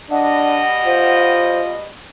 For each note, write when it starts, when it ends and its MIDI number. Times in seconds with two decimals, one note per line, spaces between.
0.11 1.90 47
0.11 1.90 55
0.11 0.65 62
0.11 1.90 75
0.11 1.32 78
0.86 1.74 65
0.86 1.61 72